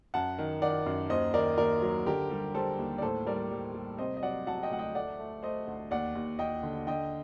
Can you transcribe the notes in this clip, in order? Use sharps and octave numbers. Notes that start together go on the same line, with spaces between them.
F#2 F#5 A5
D#3
D#3 D5 F#5
F#2
D#2 C5 D#5
D#3 A#4 D5
D#2 A#4 D5
F#3
D3 G4 A#4
G3
G3 A4 C5
D#2
D5
A2 A4 C5
G3 A#4 D5
G3
G3
C3 C5 D#5
D#5
F#3 D5 F#5
F#3 F#5 A5
D#5 G5
D2 F#5
D#5 G5
A3 D5 F#5
A3
A3 C5 D#5
D2
D#2 D5 F#5
D#2
D#2 D#5 G5
D3
D3 D#5 G5